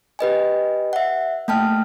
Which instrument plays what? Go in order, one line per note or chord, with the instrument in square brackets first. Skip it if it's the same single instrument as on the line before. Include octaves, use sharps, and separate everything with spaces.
[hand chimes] G4 B4 D#5 G#5
E5 F#5
A3 A#3 G5 A5 F6